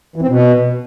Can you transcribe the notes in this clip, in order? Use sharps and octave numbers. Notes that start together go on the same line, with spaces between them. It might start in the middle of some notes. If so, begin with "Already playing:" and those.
E3
C4
B2